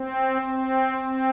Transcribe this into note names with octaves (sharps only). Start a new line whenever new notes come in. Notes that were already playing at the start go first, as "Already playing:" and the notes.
Already playing: C4
C4
C4